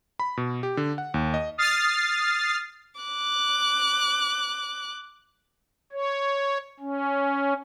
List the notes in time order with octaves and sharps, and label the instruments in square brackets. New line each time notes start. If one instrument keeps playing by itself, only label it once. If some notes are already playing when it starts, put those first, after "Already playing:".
[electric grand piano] B5
B2
G4
D3
F#5
D#2
D#5
[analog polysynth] D#6 F6 A6 C7
[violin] D6 F#6
[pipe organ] C#5
C#4